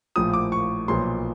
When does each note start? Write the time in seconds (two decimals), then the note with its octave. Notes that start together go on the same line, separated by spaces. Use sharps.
0.16 A#1 A2 F3 D#6
0.33 D6
0.52 C#6
0.88 B1 A#2 F3 C6